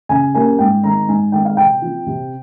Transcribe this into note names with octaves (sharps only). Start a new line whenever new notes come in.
C#3 G#5
G3 A#3 C#4 G#5
G#2 G5
D#3 G#3 C4 A#5
G#2 G#5
D#3 G#3 C4 G5
F5
C3 G5
F3 C4
C3